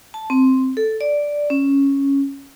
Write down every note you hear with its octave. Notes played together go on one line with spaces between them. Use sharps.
A5
C4
A4
D5
C#4